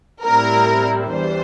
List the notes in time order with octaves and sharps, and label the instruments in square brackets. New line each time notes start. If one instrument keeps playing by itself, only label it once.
[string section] A2 G3 C4 E4 A#4
E2 E3 G3 D4 C5